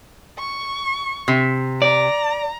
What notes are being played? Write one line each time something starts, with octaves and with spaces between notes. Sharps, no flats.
C#6
C3
D5 A#5